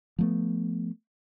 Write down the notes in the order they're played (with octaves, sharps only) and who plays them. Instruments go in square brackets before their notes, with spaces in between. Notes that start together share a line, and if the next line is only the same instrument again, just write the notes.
[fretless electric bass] F3 A3 B3